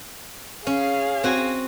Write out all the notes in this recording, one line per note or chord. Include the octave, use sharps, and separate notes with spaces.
C#4 G#4 F5
C4 F#4 G#5